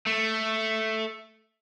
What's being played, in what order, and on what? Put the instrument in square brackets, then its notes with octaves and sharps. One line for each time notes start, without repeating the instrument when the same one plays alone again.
[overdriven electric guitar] A3